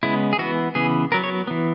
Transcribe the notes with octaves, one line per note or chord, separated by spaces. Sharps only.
C#3 G#3 B3 E4
G#4
E3 B3 F#4
C#3 E3 B3 G#4
F#3 B3 A#4
C#5
E3 B3